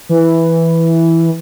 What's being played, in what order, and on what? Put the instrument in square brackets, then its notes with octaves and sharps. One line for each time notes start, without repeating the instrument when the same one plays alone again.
[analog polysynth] E3